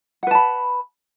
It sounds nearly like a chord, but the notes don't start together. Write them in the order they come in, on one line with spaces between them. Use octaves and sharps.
F#5 B4 A5 B5